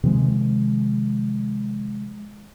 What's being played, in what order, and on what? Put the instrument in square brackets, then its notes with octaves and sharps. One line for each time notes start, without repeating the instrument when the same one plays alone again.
[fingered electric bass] C3 D#3 F3 G#3